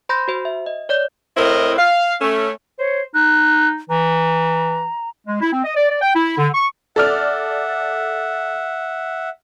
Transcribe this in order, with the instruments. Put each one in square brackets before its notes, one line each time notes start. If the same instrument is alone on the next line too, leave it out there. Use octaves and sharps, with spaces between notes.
[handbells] C5 B5 C6 G6 A#6
F#4 C5
E5
D#5
C#5 D5 G6
[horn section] A2 C4 E4 A#4 D#5
F5
A3 C#4
[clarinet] C5 [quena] C#5
[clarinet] D#4 [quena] F#6
[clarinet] E3 [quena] A#5
[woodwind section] G#3
E4
C4
D#5
D5
D5
G5
E4
D3
C#6
[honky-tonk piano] A4 D5 F6 [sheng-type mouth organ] E5 F#5